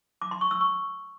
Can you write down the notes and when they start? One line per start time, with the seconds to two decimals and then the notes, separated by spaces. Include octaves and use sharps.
0.22 D6
0.31 C6
0.41 C#6
0.51 E6
0.61 C#6